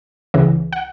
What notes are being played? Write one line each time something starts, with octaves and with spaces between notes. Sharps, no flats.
C#2 C#3 E3
F#5